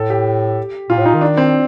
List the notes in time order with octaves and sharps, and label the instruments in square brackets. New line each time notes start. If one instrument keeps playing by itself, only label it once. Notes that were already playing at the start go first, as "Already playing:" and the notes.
Already playing: [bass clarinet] A2 [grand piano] A4
[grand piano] G4
[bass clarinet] A#2 [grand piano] F4
[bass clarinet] A2
[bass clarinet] A#2 [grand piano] D#4
[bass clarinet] D#3
[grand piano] D4
C4